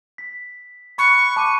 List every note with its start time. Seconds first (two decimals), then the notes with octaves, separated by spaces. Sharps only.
0.18 B6
0.98 B5 C#6 F#6
1.36 A5 D6 D#7